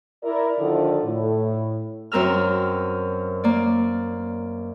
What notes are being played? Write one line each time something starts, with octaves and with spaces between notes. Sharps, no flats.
E4 A#4 D5
D3 D#3 F3 E4 A4 D5
A2
F#2 C4 A#4 E6 F6
A#3 D5